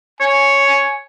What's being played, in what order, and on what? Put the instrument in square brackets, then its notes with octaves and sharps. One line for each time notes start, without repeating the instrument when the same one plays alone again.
[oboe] C#5 [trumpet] G#5